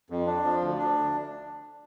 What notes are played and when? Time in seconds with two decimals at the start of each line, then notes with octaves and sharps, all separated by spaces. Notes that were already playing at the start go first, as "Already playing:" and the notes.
0.10 F2
0.27 D4
0.44 F3
0.61 D2
0.78 D4